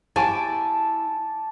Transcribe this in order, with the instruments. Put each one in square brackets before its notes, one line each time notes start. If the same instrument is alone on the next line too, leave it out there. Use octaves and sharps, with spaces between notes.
[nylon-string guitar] E4 G4 G#5 [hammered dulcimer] A5 D6